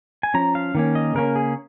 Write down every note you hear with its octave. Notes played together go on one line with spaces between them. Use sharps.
G#5
F3 C#4 A#5
F5
D#3 A#3 C#4
D#5
C#3 A#3 C#4 A#4
G#4